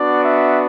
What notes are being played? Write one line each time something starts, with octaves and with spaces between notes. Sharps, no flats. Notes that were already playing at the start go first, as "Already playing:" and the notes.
Already playing: B3 D4 F#4 D5
E5